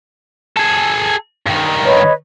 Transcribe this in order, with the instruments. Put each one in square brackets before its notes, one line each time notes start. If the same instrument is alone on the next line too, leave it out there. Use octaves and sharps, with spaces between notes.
[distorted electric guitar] G#4 A4
G2 D#3
[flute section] B4 C#5 D#5